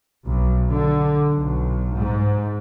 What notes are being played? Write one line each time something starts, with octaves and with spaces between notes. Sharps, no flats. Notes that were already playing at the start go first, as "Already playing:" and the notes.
B1
D3
B1
G#2